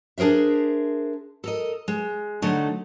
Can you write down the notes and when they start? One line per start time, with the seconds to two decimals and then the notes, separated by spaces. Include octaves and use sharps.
0.18 D4 G#4 A#4 C5 E5
1.44 A4 A#4 D#5
1.88 G#3
2.42 D3 F#3 A3 D#4